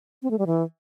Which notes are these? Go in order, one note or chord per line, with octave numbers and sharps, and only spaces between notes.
C4
A3
G3
E3